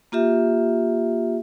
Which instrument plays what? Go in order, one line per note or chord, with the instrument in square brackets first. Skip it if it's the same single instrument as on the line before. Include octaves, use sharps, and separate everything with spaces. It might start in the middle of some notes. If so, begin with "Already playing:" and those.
[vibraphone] A#3 F4 G4 E5